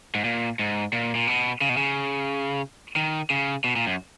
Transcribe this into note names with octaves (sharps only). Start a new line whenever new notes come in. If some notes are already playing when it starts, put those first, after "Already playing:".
G#2
A#2
G#2
A#2
A#2
B2
C#3
B2
C#3
D#3
C#3
B2
A#2
F#2